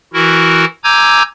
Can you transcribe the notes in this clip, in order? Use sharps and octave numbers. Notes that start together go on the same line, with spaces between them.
E3 E4 F#4 A#4
G#5 A#5 D6 E6 G6 G#6